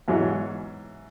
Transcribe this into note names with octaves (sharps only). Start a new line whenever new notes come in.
E2 G#2 F#3